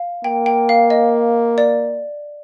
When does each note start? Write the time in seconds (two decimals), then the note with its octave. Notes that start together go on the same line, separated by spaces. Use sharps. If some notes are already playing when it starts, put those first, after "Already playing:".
Already playing: F5
0.24 A#3 G5
0.46 G5
0.69 F5
0.90 D#5
1.58 D5